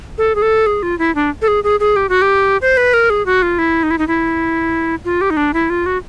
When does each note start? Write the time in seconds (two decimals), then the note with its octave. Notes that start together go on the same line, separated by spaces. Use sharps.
0.18 A4
0.35 G#4
0.42 A4
0.66 G#4
0.83 F4
0.99 E4
1.15 D4
1.42 A4
1.48 G#4
1.64 G#4
1.80 G#4
1.96 G4
2.09 F#4
2.22 G4
2.62 C5
2.77 B4
2.94 A#4
3.10 G#4
3.26 F#4
3.42 F4
3.59 E4
3.83 D#4
3.91 E4
3.98 D#4
4.08 E4
5.05 F4
5.21 G4
5.30 D#4
5.37 D4
5.54 E4
5.70 F4
5.86 F#4